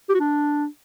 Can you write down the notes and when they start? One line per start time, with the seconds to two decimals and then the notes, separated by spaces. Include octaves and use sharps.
0.09 G4
0.14 F#4
0.20 D4